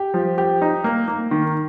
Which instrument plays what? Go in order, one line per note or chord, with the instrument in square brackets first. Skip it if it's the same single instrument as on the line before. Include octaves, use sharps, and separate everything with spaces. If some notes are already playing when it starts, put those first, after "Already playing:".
Already playing: [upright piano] G4
F3
G4
D#4
A#3
A#3
D#3